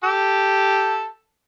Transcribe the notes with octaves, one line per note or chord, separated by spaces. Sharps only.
G4 A4